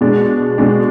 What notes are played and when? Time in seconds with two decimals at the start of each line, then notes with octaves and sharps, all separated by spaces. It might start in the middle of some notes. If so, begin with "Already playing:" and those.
0.01 B2 G#3 D4
0.58 B2 G#3 D4